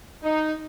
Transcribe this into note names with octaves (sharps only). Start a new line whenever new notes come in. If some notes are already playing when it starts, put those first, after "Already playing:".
D#4